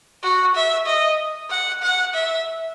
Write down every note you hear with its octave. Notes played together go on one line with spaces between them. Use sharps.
F#4
E5
D#5
F#5
F#5
E5